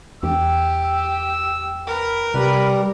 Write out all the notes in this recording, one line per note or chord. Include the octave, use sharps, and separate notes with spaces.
E2 G4 E6
E6
A#4 B4
C3 G3 B4